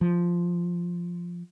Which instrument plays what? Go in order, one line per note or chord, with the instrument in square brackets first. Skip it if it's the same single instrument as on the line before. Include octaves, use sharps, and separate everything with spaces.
[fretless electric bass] F3